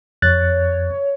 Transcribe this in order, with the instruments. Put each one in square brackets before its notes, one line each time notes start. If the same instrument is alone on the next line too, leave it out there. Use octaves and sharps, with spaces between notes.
[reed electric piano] F2 F#6 A6 [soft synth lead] C#5